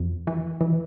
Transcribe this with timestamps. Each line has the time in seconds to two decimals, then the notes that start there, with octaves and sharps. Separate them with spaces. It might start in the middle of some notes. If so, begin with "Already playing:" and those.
Already playing: F2
0.27 E3
0.61 E3